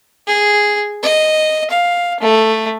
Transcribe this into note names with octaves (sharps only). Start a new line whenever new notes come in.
G#4
D#5
F5
A3